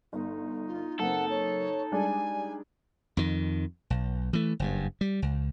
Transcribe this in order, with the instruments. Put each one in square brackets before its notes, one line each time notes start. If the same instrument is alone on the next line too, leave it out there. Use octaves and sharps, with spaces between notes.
[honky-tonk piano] G1 [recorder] D#4
[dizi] F4
[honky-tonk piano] F#1 A#3 C4 [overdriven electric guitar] A4 [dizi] F#5
[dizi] C#5
[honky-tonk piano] G3 G#3 D4 [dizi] G#5
[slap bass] F2 D#3
B1
E3 A3
F#1 G2
G3
C#2